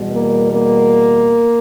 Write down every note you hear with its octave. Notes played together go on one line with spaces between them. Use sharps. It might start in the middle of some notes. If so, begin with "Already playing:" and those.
Already playing: E2 B2 G3
A#3
A#3